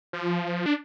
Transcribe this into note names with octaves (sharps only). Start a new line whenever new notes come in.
F3
D4